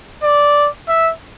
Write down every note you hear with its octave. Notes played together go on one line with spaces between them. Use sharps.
D5
E5